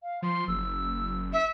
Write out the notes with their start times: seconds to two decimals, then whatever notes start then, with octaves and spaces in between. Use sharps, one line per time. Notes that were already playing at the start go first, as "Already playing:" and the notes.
0.03 F5
0.22 F3 C6
0.48 F#1 E6
1.32 E5